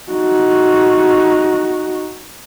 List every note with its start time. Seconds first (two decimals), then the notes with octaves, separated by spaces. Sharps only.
0.12 D#4 F#4